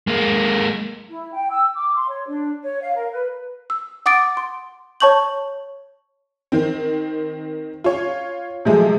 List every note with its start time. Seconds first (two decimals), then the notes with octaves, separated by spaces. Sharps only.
0.07 G#3 A#3
1.09 E4
1.32 G5
1.51 E6
1.75 D6
1.96 C6
2.08 C#5
2.26 D4
2.62 C#5
2.81 F5
2.95 A#4
3.12 B4
3.70 E6
4.06 F#5 D6 D#6 A6 D7
4.37 C6
5.00 C#5 A5 C#6 G6 F#7
6.52 D#3 C4
7.84 F4 C#5
8.65 C3 F3 F#3 G#3 A3